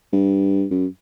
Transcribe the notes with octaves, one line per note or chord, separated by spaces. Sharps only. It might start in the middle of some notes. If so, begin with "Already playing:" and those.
G2
F#2